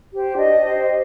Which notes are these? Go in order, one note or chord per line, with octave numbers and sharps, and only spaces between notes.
G4 C5
D4 D#5
G4 C5